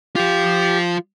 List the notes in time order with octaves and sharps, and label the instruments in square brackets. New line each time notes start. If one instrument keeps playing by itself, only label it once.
[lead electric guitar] F3 F4 [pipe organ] G4